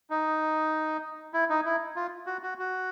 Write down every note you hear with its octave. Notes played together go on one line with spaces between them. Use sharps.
D#4
E4
D#4
E4
F4
F#4
F#4
F#4